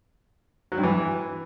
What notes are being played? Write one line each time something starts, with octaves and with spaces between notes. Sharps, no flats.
F#3
G2
E3